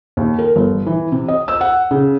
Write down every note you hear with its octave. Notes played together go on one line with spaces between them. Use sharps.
D#2
A#4
G1
E3
C3
D#5
E6
F#5
C#3